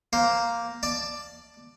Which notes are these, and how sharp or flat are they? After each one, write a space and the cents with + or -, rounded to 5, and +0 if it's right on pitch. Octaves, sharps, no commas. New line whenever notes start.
A#3 +0 C5 +5
D5 +10 A5 +0